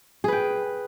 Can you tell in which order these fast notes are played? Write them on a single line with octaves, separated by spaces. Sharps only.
G#4 B4 G5